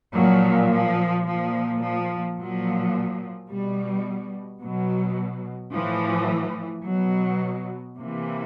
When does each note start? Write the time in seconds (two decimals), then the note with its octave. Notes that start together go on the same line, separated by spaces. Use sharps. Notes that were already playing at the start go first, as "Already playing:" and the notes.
0.14 A#2 F3 F#3
0.70 F3
1.26 A#2 F3
1.83 F3
2.38 A#2 F3 F#3
3.50 B2 G3
4.62 B2 F#3
5.73 A2 E3 F3
6.85 B2 F#3
7.97 C3 E3 A#3